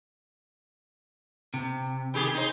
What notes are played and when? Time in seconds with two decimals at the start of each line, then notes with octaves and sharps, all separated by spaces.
1.54 C3
2.14 D#3 G4 G#4
2.35 D#4 C5